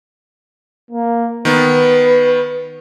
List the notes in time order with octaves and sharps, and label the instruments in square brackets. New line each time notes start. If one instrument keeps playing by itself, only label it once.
[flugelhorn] A#3
[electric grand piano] D#3 B3 [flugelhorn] B4